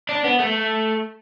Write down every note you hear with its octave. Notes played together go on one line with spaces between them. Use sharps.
D4
B3
A3